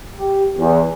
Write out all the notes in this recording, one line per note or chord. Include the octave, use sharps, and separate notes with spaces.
G4
E2